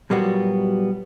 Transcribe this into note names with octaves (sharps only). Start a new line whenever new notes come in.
A#2 F#3 G3 A#3 B3 F#4